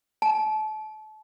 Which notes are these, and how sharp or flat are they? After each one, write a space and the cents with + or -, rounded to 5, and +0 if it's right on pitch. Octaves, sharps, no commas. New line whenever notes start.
A5 -30